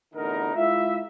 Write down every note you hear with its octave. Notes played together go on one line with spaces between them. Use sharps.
A1 E2 D3 D#4 A#4
G#3 E4 F4 E5